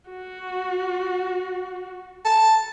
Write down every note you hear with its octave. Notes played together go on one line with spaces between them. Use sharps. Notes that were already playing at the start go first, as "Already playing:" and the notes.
F#4
A5